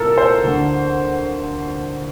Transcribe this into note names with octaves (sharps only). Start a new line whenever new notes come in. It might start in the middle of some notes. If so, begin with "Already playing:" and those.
Already playing: C2 A#2 A4 A#4
C5
D2 D3